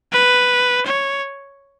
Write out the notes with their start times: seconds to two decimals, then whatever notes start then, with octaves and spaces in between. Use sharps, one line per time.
0.13 B4
0.86 C#5